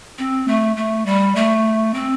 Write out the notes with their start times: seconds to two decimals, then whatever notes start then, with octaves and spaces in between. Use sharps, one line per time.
0.19 C4
0.48 A3
0.77 A3
1.06 G3
1.36 A3
1.94 C4